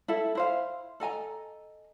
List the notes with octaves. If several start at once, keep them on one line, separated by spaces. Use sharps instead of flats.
E4 A4 E5
E4 C5 F5
A4 D#5 G#5 A#5